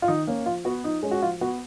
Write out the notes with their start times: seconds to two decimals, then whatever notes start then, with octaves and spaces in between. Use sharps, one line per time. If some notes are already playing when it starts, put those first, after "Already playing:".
0.02 F4
0.08 D#3 D#4
0.27 A#3 C#4
0.46 F3 F4
0.65 B3 F#4
0.84 F3 D#4
1.03 G#3 C#4
1.11 F#4
1.22 F3 F4
1.41 B3 F#4